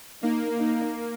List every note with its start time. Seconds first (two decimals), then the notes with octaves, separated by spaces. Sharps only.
0.22 A#3 D#4
0.58 D#4